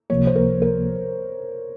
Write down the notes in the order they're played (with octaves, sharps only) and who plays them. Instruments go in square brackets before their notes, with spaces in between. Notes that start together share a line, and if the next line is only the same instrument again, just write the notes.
[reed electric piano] C#2 C3 F3 A#3 [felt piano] C#5
[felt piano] C5
A#4
A#4